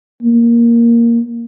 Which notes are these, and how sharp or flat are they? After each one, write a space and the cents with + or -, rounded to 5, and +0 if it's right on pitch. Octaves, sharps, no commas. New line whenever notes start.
A#3 +5